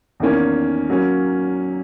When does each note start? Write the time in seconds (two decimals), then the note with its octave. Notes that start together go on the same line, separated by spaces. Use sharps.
0.20 E2 D#3 A#3 C#4
0.89 F#3 A#3 C#4